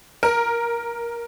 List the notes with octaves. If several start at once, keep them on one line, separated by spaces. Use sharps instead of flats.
A#4